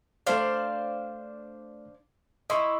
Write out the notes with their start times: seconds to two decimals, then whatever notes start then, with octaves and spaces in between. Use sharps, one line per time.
0.27 A3 D4 C5 D5 F5
2.50 E4 D#5 C6 C#6